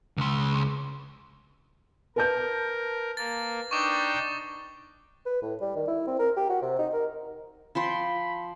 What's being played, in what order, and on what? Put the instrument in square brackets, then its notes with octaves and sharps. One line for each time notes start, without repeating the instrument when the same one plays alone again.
[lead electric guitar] C#2 C6
[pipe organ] A#4 [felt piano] B4 A5 G6
[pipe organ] A#3 [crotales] A6
[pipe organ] D4 D#4 G5 [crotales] C#6 D6
[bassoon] B4
A2
G3
D#3
E4
C4
A#4
G4
F#4
C3
D#4
A#4
[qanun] F3 G5 C6 [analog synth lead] B5